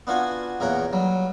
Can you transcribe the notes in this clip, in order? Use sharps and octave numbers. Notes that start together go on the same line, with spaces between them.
B3 D4 F4 F#4 G#5
E2 A#2 A#4 C#5 F#5
F#3 G3